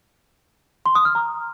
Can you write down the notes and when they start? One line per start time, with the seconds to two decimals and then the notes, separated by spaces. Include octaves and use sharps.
0.86 C6
0.95 D#6
1.05 F6
1.15 A#5